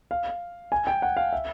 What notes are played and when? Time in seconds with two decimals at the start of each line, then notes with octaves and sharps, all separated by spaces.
0.11 F5
0.72 G#5
0.87 G5
1.02 F#5
1.17 F5
1.33 E5